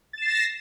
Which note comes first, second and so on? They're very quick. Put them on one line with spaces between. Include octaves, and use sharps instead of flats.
A6 E7 C7 A#6